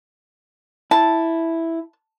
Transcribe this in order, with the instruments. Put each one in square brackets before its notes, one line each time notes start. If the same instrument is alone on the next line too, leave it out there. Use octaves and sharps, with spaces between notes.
[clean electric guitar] E4 [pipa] A5